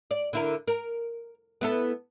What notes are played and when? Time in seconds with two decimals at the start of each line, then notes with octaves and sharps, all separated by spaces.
0.11 D5
0.33 D3 E4 A#4
0.68 A#4
1.61 B3 E4 A4